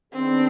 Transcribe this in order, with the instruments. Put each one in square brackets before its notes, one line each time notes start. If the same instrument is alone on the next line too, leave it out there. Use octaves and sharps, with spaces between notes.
[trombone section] D#3 B3 D4 G#4 B4 [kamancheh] C4